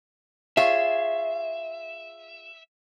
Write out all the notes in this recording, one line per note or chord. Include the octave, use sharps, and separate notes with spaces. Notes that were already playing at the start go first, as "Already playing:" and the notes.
F4 G#4 C#5 E5